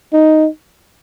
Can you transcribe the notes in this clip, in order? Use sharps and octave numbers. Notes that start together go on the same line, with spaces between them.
D#4